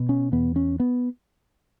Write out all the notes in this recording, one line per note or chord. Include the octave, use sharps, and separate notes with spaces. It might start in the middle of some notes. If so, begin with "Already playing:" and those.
Already playing: B2
C#4
E2 B3
C#4
B3